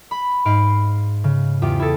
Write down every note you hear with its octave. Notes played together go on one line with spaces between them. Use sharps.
B5
G#2 F5 B5 C6 D7
C#3
E2 F4 G4 G5
E4 G#4 A4